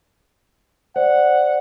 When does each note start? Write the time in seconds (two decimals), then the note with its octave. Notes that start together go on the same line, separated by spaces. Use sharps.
0.96 C5 D5 F#5